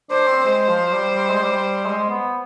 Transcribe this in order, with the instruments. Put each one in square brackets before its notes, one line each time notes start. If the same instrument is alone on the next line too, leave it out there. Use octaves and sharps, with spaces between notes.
[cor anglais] D4 [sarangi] C5
[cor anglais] C4
[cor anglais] G#3 [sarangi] C5
[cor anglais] F3
G3
G3
G#3
G3
G#3
B3